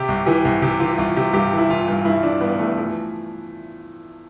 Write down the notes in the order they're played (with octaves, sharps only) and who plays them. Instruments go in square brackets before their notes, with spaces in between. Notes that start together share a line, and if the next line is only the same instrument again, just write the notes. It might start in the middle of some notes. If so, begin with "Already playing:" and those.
Already playing: [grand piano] C3 G4
C2
E3 G4
C2
C3 G4
E3 F4
C2 F4
C3 G4
G2 G4
E3
E4
E3 F4
G2
G2 E4
E3 D4
G2 B3
E3 A3
F3 A3